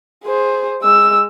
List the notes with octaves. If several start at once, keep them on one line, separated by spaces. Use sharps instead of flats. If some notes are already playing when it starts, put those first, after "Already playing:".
G#4 C5
G#3 E6